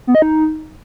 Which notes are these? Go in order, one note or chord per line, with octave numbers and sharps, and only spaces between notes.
B3
D#5
D#4